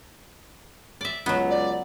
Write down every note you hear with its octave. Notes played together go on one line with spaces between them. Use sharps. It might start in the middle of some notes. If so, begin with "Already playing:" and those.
D5 E5
C#2 F#3 B3
D5